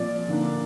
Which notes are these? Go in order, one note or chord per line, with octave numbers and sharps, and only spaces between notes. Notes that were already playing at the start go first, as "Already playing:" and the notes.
Already playing: A#2 F3 C4 D5
D3 A#3 D4